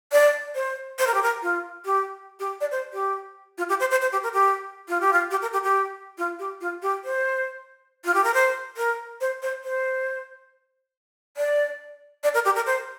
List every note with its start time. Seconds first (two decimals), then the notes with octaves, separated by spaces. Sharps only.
0.12 D5
0.55 C5
0.99 C5
1.07 A#4
1.14 G4
1.23 A#4
1.42 F4
1.85 G4
2.40 G4
2.61 D5
2.71 C5
2.93 G4
3.58 F4
3.69 G4
3.80 C5
3.91 C5
4.02 C5
4.12 G4
4.23 A#4
4.34 G4
4.88 F4
5.01 G4
5.13 F4
5.31 G4
5.42 A#4
5.53 G4
5.64 G4
6.18 F4
6.39 G4
6.61 F4
6.82 G4
7.05 C5
8.05 F4
8.14 G4
8.24 A#4
8.34 C5
8.77 A#4
9.21 C5
9.42 C5
9.64 C5
11.37 D5
12.24 D5
12.34 A#4
12.45 G4
12.56 A#4
12.67 C5